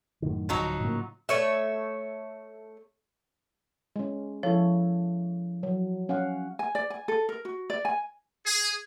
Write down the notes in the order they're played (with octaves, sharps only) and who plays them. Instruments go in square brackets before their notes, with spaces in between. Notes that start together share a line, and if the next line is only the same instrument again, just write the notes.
[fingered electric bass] F#2 A2 D#3
[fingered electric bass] D1 [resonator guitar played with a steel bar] F3 F#3 D#4
[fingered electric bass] A2 C#3 A#3
[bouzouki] A3 C#5 E5
[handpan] G#3 C#4
[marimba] F3 [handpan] E4 A4 C#5
[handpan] F#3
C#4 F5 F#5
[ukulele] G#5
D5
G#5
A4
A#4
F#4
D5
G#5
[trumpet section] G#4